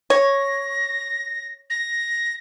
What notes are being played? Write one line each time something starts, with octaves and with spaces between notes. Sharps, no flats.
C#5 A#6
A#6